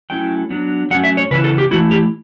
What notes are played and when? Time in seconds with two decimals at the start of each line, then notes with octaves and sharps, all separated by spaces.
0.10 F#3 A3 C#4 E4 G5
0.50 F#3 B3 D4
0.91 F#3 A3 C#4 F#5
1.04 E5
1.17 C#5
1.31 C#3 E3 B3 E4 B4
1.44 A4
1.58 G4
1.71 E3 A3 E4 F#4
1.91 G4